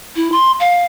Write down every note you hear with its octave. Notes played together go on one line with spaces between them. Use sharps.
E4
C6
F5